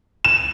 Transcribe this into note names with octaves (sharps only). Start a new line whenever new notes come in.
E7